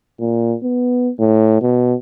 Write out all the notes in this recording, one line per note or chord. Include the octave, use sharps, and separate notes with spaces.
A#2
B3
A2
B2